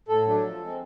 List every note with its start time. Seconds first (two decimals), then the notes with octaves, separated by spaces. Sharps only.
0.08 A2 A4
0.26 F#3 A3 D4
0.42 F3
0.60 G#3 C4